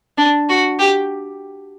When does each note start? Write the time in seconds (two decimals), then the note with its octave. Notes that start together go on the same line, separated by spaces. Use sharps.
0.18 D4
0.49 F#4
0.79 G4